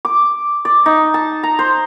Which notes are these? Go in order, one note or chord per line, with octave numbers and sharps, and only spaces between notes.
D6
D5
D#4
A5
A#5
C5